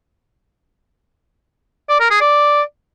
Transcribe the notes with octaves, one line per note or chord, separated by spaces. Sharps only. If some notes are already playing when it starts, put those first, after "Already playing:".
D5
A#4
G#4
D5